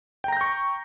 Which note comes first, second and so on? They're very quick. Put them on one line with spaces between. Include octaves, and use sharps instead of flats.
G5 A#5 A#6 G6 C#6